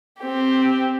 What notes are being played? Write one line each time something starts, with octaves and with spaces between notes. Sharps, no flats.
C4 G4